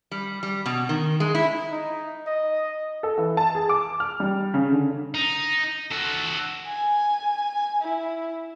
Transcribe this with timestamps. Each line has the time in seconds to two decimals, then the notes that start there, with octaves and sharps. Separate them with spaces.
0.11 G3
0.43 G3
0.66 B2
0.89 D#3
1.20 G#3
1.35 E4
1.71 D#4
2.27 D#5
3.03 A4
3.18 E3
3.37 A5
3.55 G#4
3.69 D6
4.00 F6
4.20 G3
4.54 C#3
4.72 D3
5.14 D#4
5.92 F#4 A4
6.67 G#5
7.82 E4